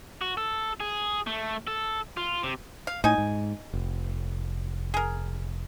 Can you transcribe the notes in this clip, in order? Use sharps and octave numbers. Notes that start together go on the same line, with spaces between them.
F#4
A4
G#4
A3
A4
F4
C3
F5
A2 D#4 G#5
G#2
F1
G#4 A#4